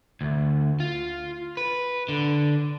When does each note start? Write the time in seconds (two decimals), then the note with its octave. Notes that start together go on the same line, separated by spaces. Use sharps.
0.21 D2
0.80 F4
1.57 B4
2.09 D3